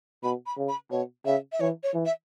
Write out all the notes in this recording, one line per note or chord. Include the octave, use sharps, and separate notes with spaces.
B2 B5
B5
C#3
B5
B2 C#5
C#3 E5
E5
E3 C#5
C#5
E3
E5